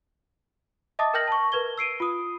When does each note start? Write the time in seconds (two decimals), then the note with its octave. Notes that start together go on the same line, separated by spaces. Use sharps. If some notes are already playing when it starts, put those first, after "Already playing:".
0.99 D#5 E5 A5 D6 D#6 A6
1.14 A#4 G5 F6 G6 A#6 F#7
1.28 A5 C#6
1.52 A#4 B4 G#6 G7
1.78 E6 C7 D7 D#7
2.00 F4 D#6